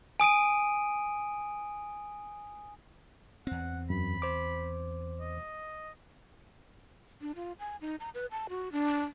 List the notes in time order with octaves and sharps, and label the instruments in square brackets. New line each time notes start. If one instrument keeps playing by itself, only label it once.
[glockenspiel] G#5 D#6 D7 D#7
[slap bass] E2 C4 [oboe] F#5
[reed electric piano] F#2 [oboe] B5
[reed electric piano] C5 D6
[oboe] D#5
[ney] D4
F4
G#5
D#4
A#5
B4
A5
F#4
D4